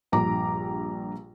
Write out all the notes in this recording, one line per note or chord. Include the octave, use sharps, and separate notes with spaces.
A#1 G2 A#5 D6